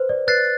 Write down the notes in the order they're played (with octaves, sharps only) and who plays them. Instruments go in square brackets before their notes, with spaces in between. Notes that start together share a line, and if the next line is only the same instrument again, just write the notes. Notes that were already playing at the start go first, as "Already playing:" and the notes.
Already playing: [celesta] B4 C5
D5
[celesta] B4 [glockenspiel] F#6 A6 C7